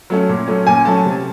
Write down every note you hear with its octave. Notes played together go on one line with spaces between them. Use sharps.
F#3 A3 C#4
A#2
F#3 A3 C#4
A#2 G#5
F#3 A3 C#4 A5
C3